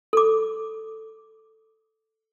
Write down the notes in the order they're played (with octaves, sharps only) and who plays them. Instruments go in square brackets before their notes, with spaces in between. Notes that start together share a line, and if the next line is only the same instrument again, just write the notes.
[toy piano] A4 D6